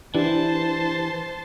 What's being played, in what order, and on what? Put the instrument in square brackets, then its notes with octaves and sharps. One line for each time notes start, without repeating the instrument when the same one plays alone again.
[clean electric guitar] E3 [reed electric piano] D4 E4 G4 [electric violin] C5 A5